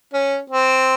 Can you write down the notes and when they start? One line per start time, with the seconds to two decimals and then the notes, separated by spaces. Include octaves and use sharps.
0.14 C#4
0.50 C4